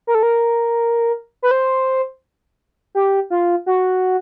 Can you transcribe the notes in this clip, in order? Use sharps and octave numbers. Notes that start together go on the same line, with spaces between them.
A#4
A4
A#4
B4
C5
G4
F4
F#4